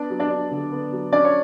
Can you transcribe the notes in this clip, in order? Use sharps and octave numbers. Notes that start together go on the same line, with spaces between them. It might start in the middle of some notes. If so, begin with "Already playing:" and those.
Already playing: B3 D4 D5
F#3
D4 D5
D4
D3
B3
F#3
C#4 D4 D5
C#5